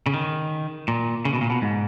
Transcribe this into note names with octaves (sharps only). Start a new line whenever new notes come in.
C#3
D#3
A#2
C#3
B2
A#2
B2
G#2